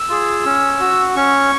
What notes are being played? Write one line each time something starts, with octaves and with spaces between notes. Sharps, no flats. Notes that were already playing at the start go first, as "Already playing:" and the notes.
Already playing: E6
F4 G#4
C#4
F#4
C#4 C#6